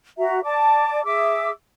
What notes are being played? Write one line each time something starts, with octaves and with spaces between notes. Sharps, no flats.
F#4 E5 A#5
D5 A5 D6
G#4 E5 D6 E6